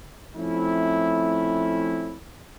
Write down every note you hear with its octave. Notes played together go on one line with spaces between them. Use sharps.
F3 A3 C4 C#4 E4